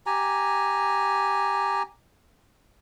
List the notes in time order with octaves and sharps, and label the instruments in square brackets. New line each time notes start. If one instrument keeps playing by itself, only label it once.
[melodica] G4 G#5 A#5